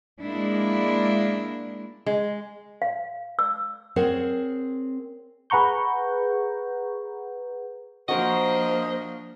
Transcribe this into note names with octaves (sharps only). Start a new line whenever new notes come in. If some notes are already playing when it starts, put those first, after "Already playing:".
G#3 A#3 D4 E4
G#3
F5
E6
C4 G#4 A#4 C5 C#5 F#5
G#4 B4 F#5 A#5 C#6 G6
F3 A#3 D4 F#4 A#4 C5 D#5